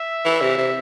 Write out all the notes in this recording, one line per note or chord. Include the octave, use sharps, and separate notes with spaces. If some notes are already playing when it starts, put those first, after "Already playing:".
Already playing: E5
E3
C3
C3